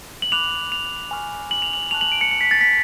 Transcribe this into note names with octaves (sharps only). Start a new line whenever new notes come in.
F#7
B5 D6 F#6 F7
F7
G#5 C#6 F6
F#7
F7
F#7
A5 C#6 F#6 F7
F#7
D7
C#7
C#7
B6
A6
B6